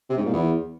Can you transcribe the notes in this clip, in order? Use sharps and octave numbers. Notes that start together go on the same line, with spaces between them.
C3
G#2
A#2
E2